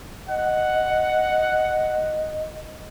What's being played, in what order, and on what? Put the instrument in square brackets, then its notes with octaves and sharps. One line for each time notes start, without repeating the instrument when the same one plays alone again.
[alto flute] D#5 [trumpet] F#5